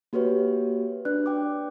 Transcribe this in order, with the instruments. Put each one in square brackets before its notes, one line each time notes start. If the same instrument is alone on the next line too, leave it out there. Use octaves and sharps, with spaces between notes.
[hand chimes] A#3 F#4 G4 B4 C#5
D4 B4 D5 F#6
G5 D6